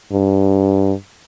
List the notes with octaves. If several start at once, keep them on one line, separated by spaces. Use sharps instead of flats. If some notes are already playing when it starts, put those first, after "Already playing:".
G2